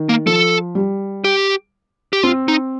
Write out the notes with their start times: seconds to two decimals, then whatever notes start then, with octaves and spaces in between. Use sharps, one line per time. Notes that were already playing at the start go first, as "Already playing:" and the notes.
Already playing: D#3
0.09 A#3
0.26 F3 A4
0.75 G3
1.24 G4
2.13 G4
2.23 C4 F4
2.48 D#4